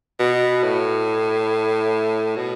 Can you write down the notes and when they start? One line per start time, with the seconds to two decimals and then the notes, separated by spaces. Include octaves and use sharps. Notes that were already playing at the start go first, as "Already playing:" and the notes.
0.19 B2
0.63 A2
2.36 B2